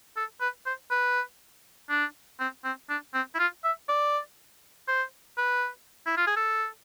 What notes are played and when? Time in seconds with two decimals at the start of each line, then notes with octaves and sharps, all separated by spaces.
0.17 A4
0.41 B4
0.66 C5
0.91 B4
1.90 D4
2.40 C4
2.64 C4
2.89 D4
3.14 C4
3.34 E4
3.39 F4
3.64 E5
3.89 D5
4.88 C5
5.38 B4
6.06 E4
6.17 F4
6.27 G#4
6.36 A4